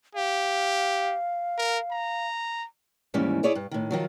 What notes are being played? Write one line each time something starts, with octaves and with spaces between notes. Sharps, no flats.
G4 F5
A#4
A#5
D#2 G#2 E3 G3 C#4
E4 G#4 C#5 D5 E5
G2
A2 D#3
D#3 F3 F#3